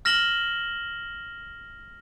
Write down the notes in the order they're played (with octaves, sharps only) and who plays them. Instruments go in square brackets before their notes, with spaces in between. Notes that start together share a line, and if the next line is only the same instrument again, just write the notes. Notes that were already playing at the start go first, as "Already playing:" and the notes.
[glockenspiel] F6 A#6 E7 F#7 G7